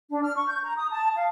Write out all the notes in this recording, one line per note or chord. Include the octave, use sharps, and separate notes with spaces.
D4
F6
C#6
G6
A#5
D#6
A5
F5